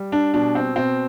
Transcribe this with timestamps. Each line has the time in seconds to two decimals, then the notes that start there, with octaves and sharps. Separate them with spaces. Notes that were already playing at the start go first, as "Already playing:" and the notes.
Already playing: G3
0.12 D4
0.34 B2 D4
0.55 C4
0.75 B2 C4